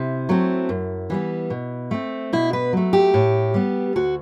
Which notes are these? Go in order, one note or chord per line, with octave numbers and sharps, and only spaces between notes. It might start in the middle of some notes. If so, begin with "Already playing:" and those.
Already playing: C3 E4
F#3 A3 C4
F#2
E3 G3 B3
B2
A3 C4
B2 E4
B4
F#3 A3
G4
A2
G3 B3
D2 F#4